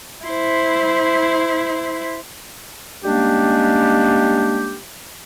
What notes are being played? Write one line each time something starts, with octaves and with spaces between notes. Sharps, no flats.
E4 C5
G3 G#3 A#3 C#4 D4 G4